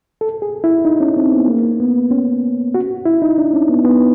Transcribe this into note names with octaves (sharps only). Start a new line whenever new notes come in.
A4
G#4
E4
D#4
C#4
C4
B3
A#3
B3
C#4
F#4
E4
D#4
D4
C#4
B3
B3